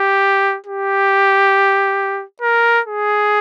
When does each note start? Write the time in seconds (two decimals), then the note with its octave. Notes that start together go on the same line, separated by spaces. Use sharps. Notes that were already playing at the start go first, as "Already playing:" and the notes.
Already playing: G4
0.66 G4
2.41 A#4
2.86 G#4